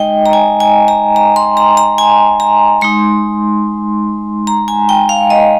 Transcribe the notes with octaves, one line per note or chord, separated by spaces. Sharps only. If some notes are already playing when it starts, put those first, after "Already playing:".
Already playing: G#3 D#4 D#5 G5
A#5
G#5
G#5
A#5
A#5
C6
A#5
A#5
G#5
A#5
G#3 D#4 C6
A#5
G#5
G5
F5
D#5